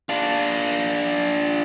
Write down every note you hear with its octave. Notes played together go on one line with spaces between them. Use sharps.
D4 F4